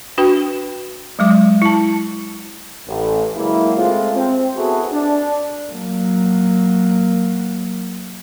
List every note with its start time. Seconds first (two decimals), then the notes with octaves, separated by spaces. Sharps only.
0.18 D4 F#4 B4 G5
1.19 F#3 G#3 D6
1.62 E4 A5
2.87 A1
3.37 C#3 F#3 G#3 A#3 E4
3.77 G#3 A3 C4 F4
4.16 C4
4.56 B3 E4 F#4 G#4 A4 B4
4.92 D4
5.71 F#3 A#3